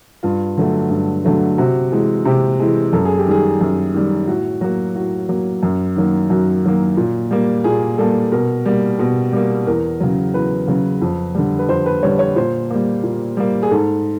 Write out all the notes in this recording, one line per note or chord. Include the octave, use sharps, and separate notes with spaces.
G2 F4
D3 F#3 A3
G2
D3 F#3 A3
C3 F#4
E3 G#3
C3 G4
E3 G#3
F#2 A4
G#4
G4
D#3 G3 G#4
F#2
D#3 G3
A2 F#4
F#3 A#3 F#4
A2 F#4
F#3 A#3
F#2
D#3 F#3 A#3
F#2 F#4
D#3 F#3 A#3
A#2
G3 A#3
A#2 G#4
G3 A#3 A4
B2 A#4
G3 A#3
B2
G3 A#3
E2 A#4
C#3 F#3
E2 B4
C#3 F#3
F2
D3 G3
B4
F2 C5
B4
D3 G3 C#5
C#5
A#2 C5
G3 A#3
A#2
G3 A#3
G#4
G#2 A4